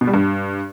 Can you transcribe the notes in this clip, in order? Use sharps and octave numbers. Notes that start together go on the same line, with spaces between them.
B2
G3
G2